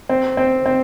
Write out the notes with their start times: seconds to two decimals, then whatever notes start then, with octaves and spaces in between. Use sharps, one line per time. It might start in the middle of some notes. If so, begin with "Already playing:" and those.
0.09 C4
0.37 C4
0.66 C4